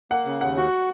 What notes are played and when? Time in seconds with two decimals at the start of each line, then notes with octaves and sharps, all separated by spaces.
0.11 A#3 F#5
0.25 C#3
0.41 D#2 F#5
0.57 F#4